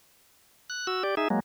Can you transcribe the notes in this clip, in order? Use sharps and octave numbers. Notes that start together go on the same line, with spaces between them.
F#6
F#4 E6
G4 D5
D#4 G#4 E5
F#3 G#3 A#3